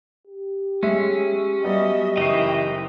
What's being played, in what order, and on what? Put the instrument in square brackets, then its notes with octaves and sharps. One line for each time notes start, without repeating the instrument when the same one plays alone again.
[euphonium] G4
[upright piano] G#3 E5 [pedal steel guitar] C#4
[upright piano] F#3 G3 B3 [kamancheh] D#5 E5
[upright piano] F#1 C#6 C7 [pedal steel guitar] E3 D#4 D#5 [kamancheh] E4 G5